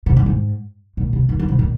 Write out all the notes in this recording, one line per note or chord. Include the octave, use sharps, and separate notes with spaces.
C3
F#2
G#2
A#2
C3
D#3
D#3
C3
A#2